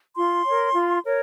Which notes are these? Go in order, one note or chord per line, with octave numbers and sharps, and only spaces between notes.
F4 C6
A#4 C#5
F4
A#4 C#5